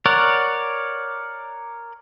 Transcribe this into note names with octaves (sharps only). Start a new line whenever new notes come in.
A#4 C#5 D5 F#5